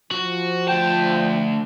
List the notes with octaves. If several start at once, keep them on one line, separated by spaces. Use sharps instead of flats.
F3 F#4
D2 G5 A5